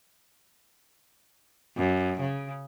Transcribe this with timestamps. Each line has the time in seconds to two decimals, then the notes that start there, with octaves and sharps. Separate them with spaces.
1.77 F#2
2.21 C#3